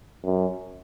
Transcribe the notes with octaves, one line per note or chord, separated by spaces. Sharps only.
F#2